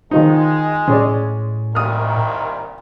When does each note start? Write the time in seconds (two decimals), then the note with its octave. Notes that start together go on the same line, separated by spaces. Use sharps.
0.11 D#3 F3 G#3 D#4
0.88 A2 C#4 G#4 D5
1.75 C2 A#2 D#3 D#6 F6